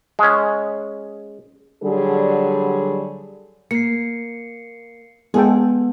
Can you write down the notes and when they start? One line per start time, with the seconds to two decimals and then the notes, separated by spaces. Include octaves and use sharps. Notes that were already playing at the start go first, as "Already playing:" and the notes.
0.19 G#3 C#4
1.83 D3 F#3 G3 G#4
3.71 A#3 C7 C#7
5.34 G#3 B3 G#4 A4 G5